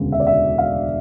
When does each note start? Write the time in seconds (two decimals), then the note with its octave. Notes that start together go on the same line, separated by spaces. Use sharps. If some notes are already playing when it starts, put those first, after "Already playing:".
Already playing: E1 D2 C#3
0.12 E5
0.20 D5
0.27 E5
0.58 F5